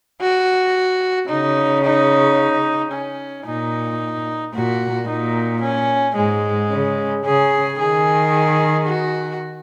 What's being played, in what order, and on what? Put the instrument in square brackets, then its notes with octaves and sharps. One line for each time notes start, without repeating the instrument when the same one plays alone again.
[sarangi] F#4
[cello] C#3 [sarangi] D#4
[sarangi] D#4
C#4
[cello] A#2 [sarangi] D#4
[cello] A#2 [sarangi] F#4
[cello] A#2 [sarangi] D#4
[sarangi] C#4
[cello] G#2 [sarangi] G#3
[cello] C#3
[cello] C#3 [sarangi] G#4
[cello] D#3 [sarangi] G#4
[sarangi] F#4